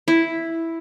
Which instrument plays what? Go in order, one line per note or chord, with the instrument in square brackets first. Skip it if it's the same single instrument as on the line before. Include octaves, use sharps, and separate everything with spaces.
[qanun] E4